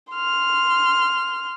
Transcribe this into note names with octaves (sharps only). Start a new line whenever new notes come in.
C6 F6